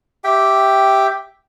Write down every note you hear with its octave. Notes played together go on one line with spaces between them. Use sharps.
G4 E5 G5